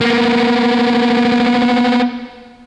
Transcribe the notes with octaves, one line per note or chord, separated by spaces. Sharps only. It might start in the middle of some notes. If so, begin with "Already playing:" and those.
A#3 B3